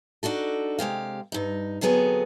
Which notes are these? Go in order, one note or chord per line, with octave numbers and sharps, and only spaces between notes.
D4 D#4 F#4 A4
C3 G#3 G4 F5
G2 D#4
D2 C3 F#3 B3 G#4 A4